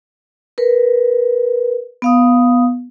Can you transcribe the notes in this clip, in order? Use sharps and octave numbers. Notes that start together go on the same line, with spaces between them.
A#4 B4
B3 F5 D#6